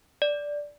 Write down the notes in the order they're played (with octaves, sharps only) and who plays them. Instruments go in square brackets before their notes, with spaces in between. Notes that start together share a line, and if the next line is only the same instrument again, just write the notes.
[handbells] D5